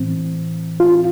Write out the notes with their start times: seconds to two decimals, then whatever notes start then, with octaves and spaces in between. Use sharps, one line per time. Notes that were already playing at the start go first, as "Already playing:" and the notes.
Already playing: A2 E3 C4
0.80 F4